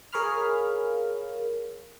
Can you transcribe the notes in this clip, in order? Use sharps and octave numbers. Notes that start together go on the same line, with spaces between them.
G#4 A#4 C#5 F5 B5 F6